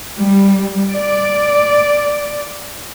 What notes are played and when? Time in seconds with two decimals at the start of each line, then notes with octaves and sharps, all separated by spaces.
0.20 G3
0.91 D5